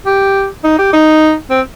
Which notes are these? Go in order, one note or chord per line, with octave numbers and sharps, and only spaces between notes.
G4
D#4
G4
D#4
C4